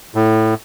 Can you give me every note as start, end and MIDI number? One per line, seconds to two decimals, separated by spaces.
0.15 0.54 45